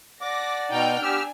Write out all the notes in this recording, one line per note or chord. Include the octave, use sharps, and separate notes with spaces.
D5 F#5 A5 D6 A#6
B2 D#4 G5 F6
B3 D4 G4 G#5 E6 F6